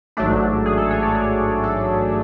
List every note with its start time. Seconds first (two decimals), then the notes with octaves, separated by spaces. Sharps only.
0.17 A1 G#2 F#3 A3 D4
0.66 G#4
0.78 A4
0.90 C#5
1.03 D5
1.15 C#5
1.64 A4